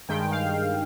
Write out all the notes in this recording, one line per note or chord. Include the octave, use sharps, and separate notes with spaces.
G2 D#3 G#3 G5
F5